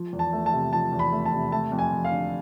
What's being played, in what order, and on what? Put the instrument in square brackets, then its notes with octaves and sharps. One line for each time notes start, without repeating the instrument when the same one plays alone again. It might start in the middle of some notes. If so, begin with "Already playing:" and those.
Already playing: [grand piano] F3
E2
A5
A3
A5
C3
F3 A5
E2
B5
A3
A5
C3
A3 A5
F2
G#5
F2
F5
D3